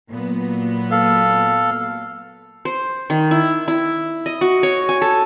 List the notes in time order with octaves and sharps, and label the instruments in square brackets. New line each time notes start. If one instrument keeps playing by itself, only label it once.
[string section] A#2 F#3 B3
[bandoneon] A4 F5
[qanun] C5
D#3
E4
E4
D#5
F#4
C#5
G#5
A4